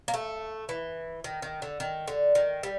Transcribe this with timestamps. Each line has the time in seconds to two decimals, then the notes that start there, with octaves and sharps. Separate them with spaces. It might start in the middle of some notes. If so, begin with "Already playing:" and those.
0.08 A#3
0.14 A3
0.69 E3
1.24 D#3
1.42 D#3
1.62 D3
1.80 D#3
2.08 D3
2.35 D#3
2.63 G3